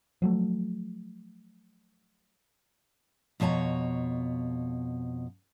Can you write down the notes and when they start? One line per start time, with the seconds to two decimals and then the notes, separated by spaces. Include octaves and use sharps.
0.22 F3 F#3 A3
3.40 F2 B2 C#5 G#5 A#5